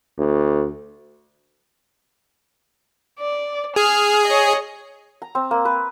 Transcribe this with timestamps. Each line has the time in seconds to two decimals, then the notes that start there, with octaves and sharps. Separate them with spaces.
0.18 D2
3.20 D5
3.76 G#4 F6
4.26 C#5 D#5
5.22 A#5
5.35 C4
5.51 A#3
5.65 B4